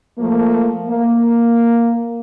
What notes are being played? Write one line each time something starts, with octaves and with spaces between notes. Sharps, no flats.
F3 A3 A#3
A#3